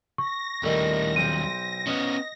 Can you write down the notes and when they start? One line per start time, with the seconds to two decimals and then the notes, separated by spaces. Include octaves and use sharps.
0.18 C#6 A#6
0.63 D#2 A2 D#3 G3
1.16 B1 C5 G5 D#7
1.87 B3 C#4 D#5